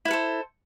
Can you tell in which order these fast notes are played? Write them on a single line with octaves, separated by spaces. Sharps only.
E4 B4 A4 C5